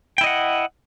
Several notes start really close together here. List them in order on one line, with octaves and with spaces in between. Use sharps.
G5 E4 D#5 F#5